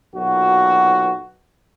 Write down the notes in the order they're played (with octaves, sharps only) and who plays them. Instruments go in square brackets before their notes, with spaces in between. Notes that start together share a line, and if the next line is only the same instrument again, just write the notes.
[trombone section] B1 A#2 F#4